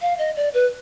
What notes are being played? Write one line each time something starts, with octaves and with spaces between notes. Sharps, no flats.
F5
D#5
D5
B4